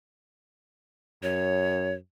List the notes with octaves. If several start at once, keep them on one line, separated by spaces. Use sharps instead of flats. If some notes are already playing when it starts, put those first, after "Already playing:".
F#2 C#5